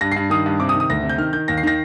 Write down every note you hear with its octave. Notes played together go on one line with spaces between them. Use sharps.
G2 A#6
C7
G2
D#3 D#6
G2
C3 D6
D#6
D#3
D#6
D2 A#6
C3
G6
D#3 F6
D#3 G6
D#2 A#6
C7
D#3 A#6